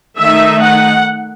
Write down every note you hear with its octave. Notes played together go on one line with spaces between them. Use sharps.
D#3 A3 D#4 E5
F#5